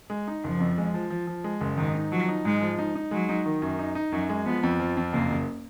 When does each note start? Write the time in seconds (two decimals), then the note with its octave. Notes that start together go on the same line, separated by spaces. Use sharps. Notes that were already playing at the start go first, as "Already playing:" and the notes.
0.10 G#3
0.28 D#4
0.44 F#1 F3
0.60 F2
0.78 G#3
0.94 F3
1.10 F3
1.27 F3
1.44 G#3
1.61 F#1
1.77 G#2 D#3
1.95 D#4
2.12 F3 F#3
2.28 D#4
2.45 G#2 G#3
2.61 F3
2.78 D#4
2.95 D#4
3.11 F#3 G#3
3.29 D#4
3.46 D#3
3.62 F#2
3.79 D#4
3.95 D#4
4.12 F#2 F#3
4.29 G#3
4.45 F3 B3
4.63 F2
4.79 F3
4.97 F2
5.12 F#1 A#3
5.30 F#1